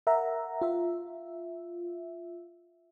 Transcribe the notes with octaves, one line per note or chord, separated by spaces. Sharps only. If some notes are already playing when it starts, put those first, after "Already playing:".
A#4 E5 F#5 A#5
F4 E5